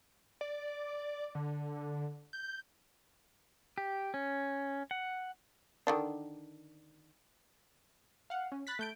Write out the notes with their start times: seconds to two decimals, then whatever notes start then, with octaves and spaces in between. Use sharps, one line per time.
0.41 D5
1.35 D3
2.33 G6
3.78 G4
4.14 C#4
4.91 F#5
5.87 D3 D#3 D4
8.30 F5 F#5
8.52 C#4
8.67 B5 F#6 A6 B6
8.79 A3 G6 D7